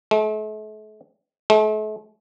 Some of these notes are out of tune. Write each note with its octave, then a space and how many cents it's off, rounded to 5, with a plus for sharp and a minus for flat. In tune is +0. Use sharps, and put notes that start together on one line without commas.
A3 -45
A3 -45